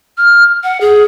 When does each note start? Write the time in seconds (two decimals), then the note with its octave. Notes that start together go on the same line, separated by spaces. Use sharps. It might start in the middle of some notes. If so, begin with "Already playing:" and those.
0.18 F6
0.63 F#5
0.81 G#4